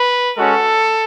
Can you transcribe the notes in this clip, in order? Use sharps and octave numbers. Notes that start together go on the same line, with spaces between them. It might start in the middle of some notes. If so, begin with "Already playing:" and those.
Already playing: B4
G#3 C#4 F#4 A4